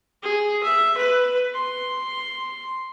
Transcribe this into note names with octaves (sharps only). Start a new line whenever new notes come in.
G#4
E5
B4
C6